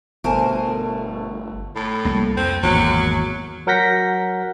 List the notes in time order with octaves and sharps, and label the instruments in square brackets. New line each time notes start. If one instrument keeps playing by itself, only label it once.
[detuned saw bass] G1 [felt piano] B2 [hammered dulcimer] A3 [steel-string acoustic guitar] A#4 C5 G#5
[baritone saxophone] A2
[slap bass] C2 A#3
[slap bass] F2 [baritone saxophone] C4
[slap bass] G#1 E2 A#3 [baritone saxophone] F#3
[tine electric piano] F#3 A#4 F#5 G6 A#6 B6